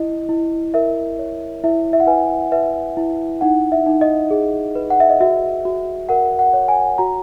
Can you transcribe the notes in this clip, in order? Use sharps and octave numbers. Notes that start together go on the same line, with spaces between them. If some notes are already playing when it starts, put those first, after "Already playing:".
Already playing: E4 D#5
E4
A#4 E5
C#5
E4 E5
E5
F#5
B4 G#5
B4 E5
E4
D#4 F#5
E5
D#4
D#5
G#4
B4
F#5
E5
D#5
F#4 E5
F#4
A#4 F#5
F#5
C#5
G#5
F#4 A#5